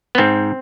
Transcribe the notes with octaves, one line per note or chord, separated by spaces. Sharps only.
B3
G#2 C4